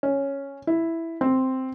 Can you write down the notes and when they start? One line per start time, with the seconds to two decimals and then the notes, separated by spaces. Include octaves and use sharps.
0.03 C#4
0.67 E4
1.21 C4